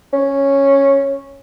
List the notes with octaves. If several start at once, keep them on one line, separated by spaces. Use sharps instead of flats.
C#4